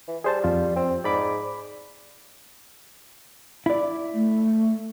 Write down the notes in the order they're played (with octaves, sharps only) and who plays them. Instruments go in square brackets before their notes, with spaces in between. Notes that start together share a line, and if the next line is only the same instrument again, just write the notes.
[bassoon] E3
[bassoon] G3 [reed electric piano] G#4 C5 A5
[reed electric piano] F2 F4
[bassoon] C4
[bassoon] G#2 [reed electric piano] D5 B5 D6
[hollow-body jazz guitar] E4 D5
[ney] A3